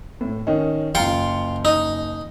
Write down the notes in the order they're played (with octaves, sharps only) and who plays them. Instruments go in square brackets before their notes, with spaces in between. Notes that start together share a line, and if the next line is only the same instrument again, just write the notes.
[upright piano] A2
D#3 C#4 D#4
[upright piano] F#1 A#5 C#7 [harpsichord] F4 G5 C6
[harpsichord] D#4